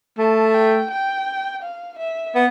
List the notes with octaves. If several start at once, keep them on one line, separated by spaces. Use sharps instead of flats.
A3 A5
G5
G5
F5
E5
B3